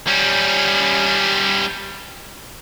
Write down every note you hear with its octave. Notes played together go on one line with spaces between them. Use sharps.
G3 C#4